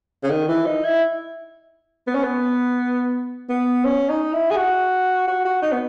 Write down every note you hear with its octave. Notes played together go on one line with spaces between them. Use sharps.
C#3
D#3
E3
D#4
E4
B3
C#4
B3
B3
C#4
D#4
E4
G#4
F#4
F#4
F#4
D#4
B3